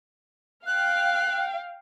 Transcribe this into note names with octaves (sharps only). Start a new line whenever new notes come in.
F5 G5 F#6